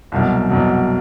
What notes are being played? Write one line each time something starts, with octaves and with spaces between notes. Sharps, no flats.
C2 B2 F#3
C2 B2 F#3